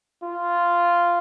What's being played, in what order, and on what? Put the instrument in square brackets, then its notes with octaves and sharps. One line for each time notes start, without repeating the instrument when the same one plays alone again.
[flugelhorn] F4